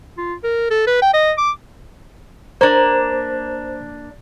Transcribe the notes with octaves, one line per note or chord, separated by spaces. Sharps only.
F4
A#4
A4
B4
G5
D#5
D6
A#3 D4 C5